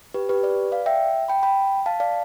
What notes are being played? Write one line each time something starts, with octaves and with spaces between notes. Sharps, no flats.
G4 B4
G4 B4
B4 D5
D5 F5
E5 G5
G5 B5
G5 B5
F5 A5
D5 F5